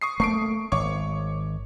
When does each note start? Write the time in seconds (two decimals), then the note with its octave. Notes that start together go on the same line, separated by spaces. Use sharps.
0.02 C#6 D#6 C7
0.20 A3 A#3 C#6 C7 D7
0.72 G#1 C#5 C#6 D6